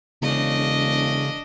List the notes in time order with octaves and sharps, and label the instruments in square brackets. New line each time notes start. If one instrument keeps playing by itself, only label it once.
[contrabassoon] E1 [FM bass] C#3 [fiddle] D4 D#5